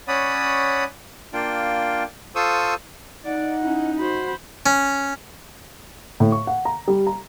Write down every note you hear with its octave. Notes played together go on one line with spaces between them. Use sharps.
C#4 C#5 D5 F#5 B5 D#6
A#3 D4 F4 G5
F4 A4 C5 C#6 D#6 E6
D#4 D5 F#5
C#4 E4
F#4 C5 B5
C#4
A2
C#6
F#5
A#5
G3
A#5